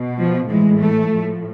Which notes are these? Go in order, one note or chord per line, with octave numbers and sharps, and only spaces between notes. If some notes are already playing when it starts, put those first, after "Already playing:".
Already playing: B2
F3
A2 E3 G#3
A3
A2 F3